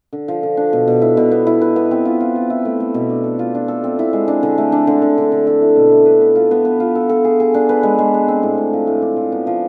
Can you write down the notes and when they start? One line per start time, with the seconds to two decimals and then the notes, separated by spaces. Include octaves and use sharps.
0.13 D3
0.28 F3
0.43 D3
0.57 D4
0.73 B2
0.88 B2
1.02 E4
1.17 B2
1.32 B3
1.47 E4
1.62 B4
1.76 B3
1.91 C4
2.05 F4
2.20 F4
2.36 F4
2.50 E4
2.65 A3
2.80 A3
2.94 B2
3.10 D4
3.24 A4
3.39 F4
3.55 D4
3.68 A4
3.84 C4
3.99 E4
4.13 G#3
4.28 D4
4.43 D3
4.58 A3
4.72 D4
4.87 D3
5.02 D3
5.18 D3
5.32 D3
5.47 E4
5.62 E4
5.76 B2
5.92 E4
6.06 B4
6.21 B3
6.36 F4
6.51 B3
6.65 B3
6.80 F4
6.95 A4
7.09 A4
7.24 G#4
7.40 G#4
7.54 D4
7.69 B4
7.83 G#3
7.99 G#3
8.14 G#4
8.28 C4
8.43 A2
8.58 A2
8.73 F3
8.87 A2
9.02 D4
9.17 F3
9.32 B3
9.47 F3